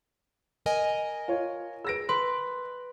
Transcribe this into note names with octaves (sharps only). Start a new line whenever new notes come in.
A#4 D#5 G#5
F4 C#5
G#4 B4 E6 A#6 D7
B4 C6